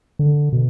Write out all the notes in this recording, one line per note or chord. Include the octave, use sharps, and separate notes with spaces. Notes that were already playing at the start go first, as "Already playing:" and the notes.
D3
B2